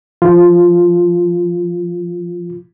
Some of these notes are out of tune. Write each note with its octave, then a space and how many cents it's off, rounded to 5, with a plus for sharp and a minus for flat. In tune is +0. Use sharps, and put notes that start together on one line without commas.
F3 +0 F4 +0